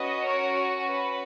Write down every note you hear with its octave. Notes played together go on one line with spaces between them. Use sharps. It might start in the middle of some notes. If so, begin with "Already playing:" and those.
Already playing: C#4 F#4 B4 D#5
A#4 C#5
B4